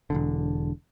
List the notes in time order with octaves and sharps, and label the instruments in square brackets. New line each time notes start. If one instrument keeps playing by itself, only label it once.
[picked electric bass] E1 A#1 D3